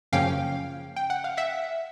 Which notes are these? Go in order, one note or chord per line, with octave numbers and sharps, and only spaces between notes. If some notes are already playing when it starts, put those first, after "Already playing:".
F#2 C#3 F3 A#3 C#4 F5 G5
G5
F#5
F5
E5 F#5